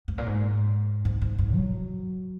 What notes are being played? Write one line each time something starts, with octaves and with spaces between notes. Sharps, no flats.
G#2
A#2
G#2
G#2
G#2
G#2
F#3